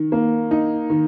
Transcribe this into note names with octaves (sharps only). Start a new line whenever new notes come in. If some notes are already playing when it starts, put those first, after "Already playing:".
Already playing: D#3
A#3
D#4
D#3